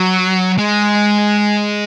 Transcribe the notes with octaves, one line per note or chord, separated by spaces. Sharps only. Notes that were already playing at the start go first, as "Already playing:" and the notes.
Already playing: F#3
G#3